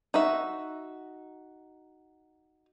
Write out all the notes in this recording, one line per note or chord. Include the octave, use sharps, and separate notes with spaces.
D#4 F#4 E5